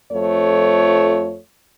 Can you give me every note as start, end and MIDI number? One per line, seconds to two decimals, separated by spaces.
0.12 1.38 41
0.12 1.38 53
0.12 1.38 57
0.12 1.38 73